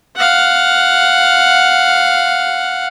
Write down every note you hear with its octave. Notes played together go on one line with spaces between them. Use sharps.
F5 F#5